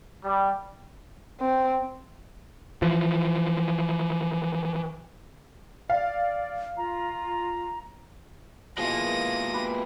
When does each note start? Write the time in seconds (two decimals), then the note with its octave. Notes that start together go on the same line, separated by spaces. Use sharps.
0.23 G3
1.41 C4
2.82 E3 F3
5.90 D5 F5
6.77 F4 A#5
8.78 B2 E3 G#3 A#3 F4 A#6 D#7
9.54 G4 B4